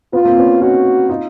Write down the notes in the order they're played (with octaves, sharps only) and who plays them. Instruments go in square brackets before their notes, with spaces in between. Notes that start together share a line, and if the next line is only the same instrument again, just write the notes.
[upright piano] B3 [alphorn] F4
[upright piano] A#3 C4
B3 C#4
[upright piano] C#4 D#4 [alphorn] F#4
[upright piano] D#4 F4